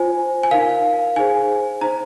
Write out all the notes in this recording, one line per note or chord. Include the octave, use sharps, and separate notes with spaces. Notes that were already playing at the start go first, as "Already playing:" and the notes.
Already playing: F4 C5 G#5
G#5
D#4 A#4 F5
D#4 G#4 C5 G#5
D#4 C5 A#5